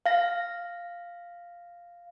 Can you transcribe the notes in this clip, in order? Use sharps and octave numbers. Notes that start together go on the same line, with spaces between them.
F5 A#6